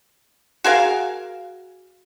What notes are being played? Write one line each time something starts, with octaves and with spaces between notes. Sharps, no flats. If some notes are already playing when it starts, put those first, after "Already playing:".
F#4 G#4 A#4 F5